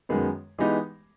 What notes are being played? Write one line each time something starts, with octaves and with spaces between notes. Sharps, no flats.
F#2 D#3 G#3 B3
E3 G#3 B3 D#4 G4